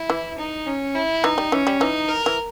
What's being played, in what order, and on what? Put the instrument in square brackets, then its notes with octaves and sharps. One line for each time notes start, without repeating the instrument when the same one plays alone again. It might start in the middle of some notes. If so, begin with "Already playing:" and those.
Already playing: [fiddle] E4
[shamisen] E3
[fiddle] D#4
C#4
E4
[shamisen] E3 [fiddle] D#4
[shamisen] G3
[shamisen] E3 [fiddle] C#4
[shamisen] G3
[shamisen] E3 [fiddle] D#4
[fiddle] A#4
[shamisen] E3